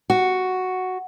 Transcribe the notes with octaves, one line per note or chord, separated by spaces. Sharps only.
F#4